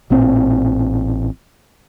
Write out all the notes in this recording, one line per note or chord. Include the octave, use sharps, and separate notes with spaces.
A1 A#2 C4